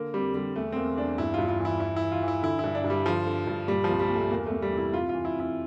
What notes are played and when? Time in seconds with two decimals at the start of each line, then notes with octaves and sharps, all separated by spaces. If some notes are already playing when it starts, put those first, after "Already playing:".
Already playing: D3 A#3
0.14 F2 G3
0.34 D3 G3
0.56 E2 A3
0.72 C4
0.76 E2 A#3
0.97 E2 D4
1.18 G2 E4
1.34 G2 F4
1.49 F4
1.60 E3
1.65 E4
1.80 E3 E4
1.96 E4
2.01 E3
2.12 F4
2.23 E3
2.28 E4
2.43 D3 E4
2.59 G2 E4
2.75 D4
2.84 G2
2.90 G3
3.06 D3 F3
3.26 D3
3.47 G2
3.68 A#2 G3
3.84 F3
3.89 C2
4.00 G3
4.09 A#2
4.15 A3
4.31 E2 A#3
4.46 A3
4.52 E2
4.62 G3
4.73 C3 E4
4.94 F2 F4
5.09 E3 F4
5.25 E4
5.35 F2
5.40 E4